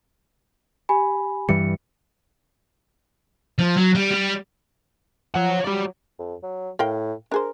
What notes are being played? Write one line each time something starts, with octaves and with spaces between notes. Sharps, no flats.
G4 G#5 B5
G2 E3 G3 C#7
F3
F#3
G3
G3
F3 C#5 F#5
F#3 G4 D5
F2
F#3
A2 A#4 F5 G5
D4 G#4 A#4 C5